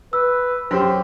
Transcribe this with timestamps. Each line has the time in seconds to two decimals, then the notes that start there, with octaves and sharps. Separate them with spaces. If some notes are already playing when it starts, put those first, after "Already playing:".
0.13 B4 E6
0.71 F#2 G4 C5